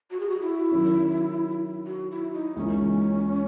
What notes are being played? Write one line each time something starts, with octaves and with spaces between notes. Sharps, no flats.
F#4
G#4
F#4
E4
D#3 F#3 C#4
F#4
E4
D#4
C#2 C#3 E3 A#3 C#4 D#4